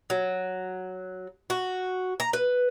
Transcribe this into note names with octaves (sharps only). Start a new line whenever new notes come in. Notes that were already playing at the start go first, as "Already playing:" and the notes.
F#3
F#4
A#5
B4